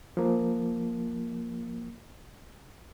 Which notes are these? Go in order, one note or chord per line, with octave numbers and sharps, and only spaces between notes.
F3 A#3